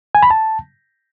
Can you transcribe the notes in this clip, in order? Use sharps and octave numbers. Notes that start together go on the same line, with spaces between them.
G#5
B5
A5